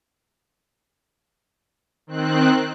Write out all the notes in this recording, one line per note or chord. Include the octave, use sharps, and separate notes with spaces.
D#3 C4 F#6